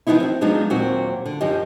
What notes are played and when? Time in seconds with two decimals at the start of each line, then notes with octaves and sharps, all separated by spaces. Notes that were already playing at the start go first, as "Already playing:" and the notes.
0.07 D#3 F3 B3 C4 D#4 E4
0.20 C4 F#4
0.41 F3 F#3 G#3 B3 D4 D#4
0.70 D#2 A#2 F#3 C4 F#4
1.26 D3
1.41 F#2 F3 D4 G4 D#5